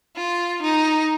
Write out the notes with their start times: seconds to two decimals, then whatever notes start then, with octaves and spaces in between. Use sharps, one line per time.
0.17 F4
0.62 D#4